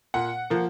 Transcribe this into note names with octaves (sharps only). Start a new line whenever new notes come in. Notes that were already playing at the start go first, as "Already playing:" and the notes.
A#2 F#5
F3 A#3